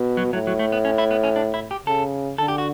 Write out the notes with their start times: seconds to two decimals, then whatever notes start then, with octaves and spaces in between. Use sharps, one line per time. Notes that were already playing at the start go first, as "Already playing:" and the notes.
Already playing: B2
0.17 F#3
0.33 A2 F#3
0.47 F#3
0.59 A3
0.72 B3
0.85 C#4
0.98 E4
1.11 B3
1.23 C#4
1.36 D4
1.54 E4
1.71 G4
1.87 C#3 A4
2.38 D3 A4
2.48 G4
2.58 F#4